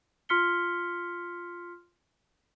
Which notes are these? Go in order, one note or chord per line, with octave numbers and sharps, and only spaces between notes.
F4 C6 F6 B6 C#7 G7